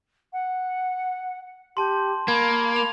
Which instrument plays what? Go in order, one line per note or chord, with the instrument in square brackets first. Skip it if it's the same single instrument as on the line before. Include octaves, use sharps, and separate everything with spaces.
[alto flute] F#5
[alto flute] G4 [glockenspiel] A5 C6
[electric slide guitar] A#3 [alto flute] B5 [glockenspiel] G#6
[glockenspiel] F7